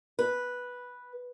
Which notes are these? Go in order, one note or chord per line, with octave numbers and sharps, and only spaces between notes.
B4